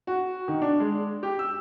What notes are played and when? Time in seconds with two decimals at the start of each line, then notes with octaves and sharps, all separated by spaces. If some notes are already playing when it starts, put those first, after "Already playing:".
0.07 F#4
0.48 D#3
0.62 D4
0.80 G#3
1.23 G4
1.39 E6